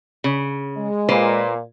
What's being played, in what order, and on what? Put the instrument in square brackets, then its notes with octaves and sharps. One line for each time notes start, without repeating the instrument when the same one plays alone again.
[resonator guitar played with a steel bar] C#3
[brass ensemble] G#3
[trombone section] A#2 [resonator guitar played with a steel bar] A#3 B4 C5